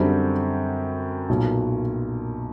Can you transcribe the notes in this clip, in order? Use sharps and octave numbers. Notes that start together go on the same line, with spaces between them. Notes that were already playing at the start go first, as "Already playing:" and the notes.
Already playing: F#2 D3 G3 C4
B1 A#2 F#3